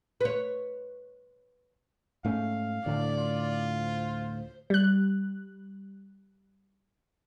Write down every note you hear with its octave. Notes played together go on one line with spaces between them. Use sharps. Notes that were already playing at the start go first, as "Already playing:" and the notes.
B4 C#5
G#2 A3 C#4 F5
D2 A2 D3 D5
F4
C5
G3 F#6